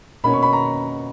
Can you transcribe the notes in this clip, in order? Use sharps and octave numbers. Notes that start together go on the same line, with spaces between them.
B2 A#3 C#4 B5
C#6
B5
A#5